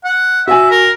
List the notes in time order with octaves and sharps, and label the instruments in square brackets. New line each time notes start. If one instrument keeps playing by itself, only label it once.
[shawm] F#5
[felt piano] F#4 G#5 [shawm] E5
[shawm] A#4